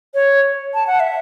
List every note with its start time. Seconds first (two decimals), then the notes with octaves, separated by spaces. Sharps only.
0.14 C#5
0.74 A5
0.87 F#5
1.00 E5